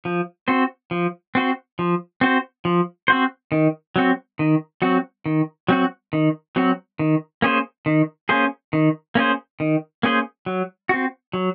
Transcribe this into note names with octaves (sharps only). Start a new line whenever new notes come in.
F3
C4 F#4 C5
F3
C4 F#4 C5
F3
C4 F#4 C5
F3
C4 F#4 C5
D#3
F#3 C4 F#4
D#3
F#3 C4 F#4
D#3
F#3 C4 F#4
D#3
F#3 C4 F#4
D#3
A#3 C#4 G#4 C5
D#3
A#3 C#4 G#4 C5
D#3
A#3 C#4 G#4 C5
D#3
A#3 C#4 G#4 C5
F#3
C4 F#4
F#3